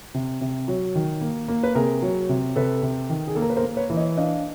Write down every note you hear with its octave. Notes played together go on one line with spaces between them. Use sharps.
C3
C3
F#3
D#3
A#3
A#3
B4
C3 G#4 A#4
F#3
C3
C3 A4 B4
C3
D#3
G#4
A#3 A4
A#4
B4
A#4 C5
A#3
B4 C#5
E3
C#5 D#5
D4 D#5 F5